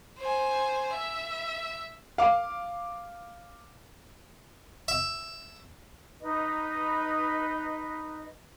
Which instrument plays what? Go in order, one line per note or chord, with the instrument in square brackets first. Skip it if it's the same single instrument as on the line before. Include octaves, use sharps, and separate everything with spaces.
[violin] C5 G#5
E5
[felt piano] F5 D6
[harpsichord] E5
[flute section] D#4 B4 D#5